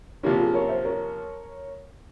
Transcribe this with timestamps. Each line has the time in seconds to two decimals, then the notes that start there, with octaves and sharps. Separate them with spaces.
0.23 C3 F3 A#3 C#4 E4 G4
0.38 F4 G#4
0.54 A#4 C#5
0.68 C5 E5
0.84 A#4 C#5